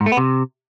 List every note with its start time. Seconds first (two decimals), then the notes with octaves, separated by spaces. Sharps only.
0.01 G#2
0.06 A3
0.12 B3
0.17 C3